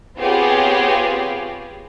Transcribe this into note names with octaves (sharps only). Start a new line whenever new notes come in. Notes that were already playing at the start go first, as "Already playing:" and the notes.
B3 C4 F4 G4 G#4 C#5